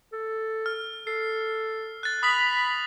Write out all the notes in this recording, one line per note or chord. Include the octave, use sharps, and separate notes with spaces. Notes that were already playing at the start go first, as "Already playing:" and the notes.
A4
F6
A4 C7
F#6 A6
B5 D#6 B6 F#7